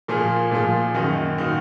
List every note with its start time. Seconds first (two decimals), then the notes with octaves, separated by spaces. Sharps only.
0.08 A#2 F3 A#3 F4 G#4
0.51 A#2 F3 A#3 F4 G#4
0.94 F#2 D#3 A#3 D#4 F#4
1.38 D#3 A#3 D#4 F#4